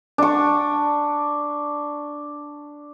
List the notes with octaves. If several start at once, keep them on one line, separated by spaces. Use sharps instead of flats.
D4 C#6